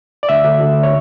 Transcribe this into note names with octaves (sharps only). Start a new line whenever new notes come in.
D5
D2 E5
D2
D2
C#5